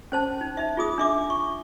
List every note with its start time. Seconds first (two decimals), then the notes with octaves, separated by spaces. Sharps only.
0.12 C#4 C5 A5
0.41 D#4
0.57 D#4 E5
0.77 F4 G#4 D#6
0.98 D4 E5 D6
1.30 C#6